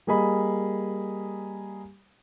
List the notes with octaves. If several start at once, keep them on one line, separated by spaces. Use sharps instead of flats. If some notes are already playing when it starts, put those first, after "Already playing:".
G3 A#3 G#4 D#5 B5